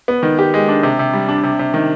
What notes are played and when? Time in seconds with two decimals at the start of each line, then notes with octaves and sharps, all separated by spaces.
0.08 B3
0.23 D#3
0.39 G4
0.54 G#3
0.68 D4
0.83 C3
0.99 C3
1.13 G3
1.29 D4
1.43 C3
1.59 C3
1.74 D#3